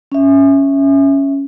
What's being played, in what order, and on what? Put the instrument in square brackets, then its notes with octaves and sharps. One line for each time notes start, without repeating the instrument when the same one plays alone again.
[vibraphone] C#4 E5